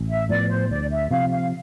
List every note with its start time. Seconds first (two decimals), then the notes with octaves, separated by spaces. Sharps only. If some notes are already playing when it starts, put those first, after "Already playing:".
Already playing: A1
0.09 E5
0.29 A2 F3 B3 D5
0.50 C5
0.70 D2 D5
0.91 E5
1.11 C3 F3 C4 F5
1.32 F5